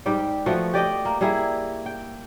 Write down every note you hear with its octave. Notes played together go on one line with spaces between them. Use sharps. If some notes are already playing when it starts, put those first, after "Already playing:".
G#2 G3 G4 G5
F3 A3 B3 F#4
G4 D5 D#5 G5
A#3
G3 A#3 E4 G#4
G5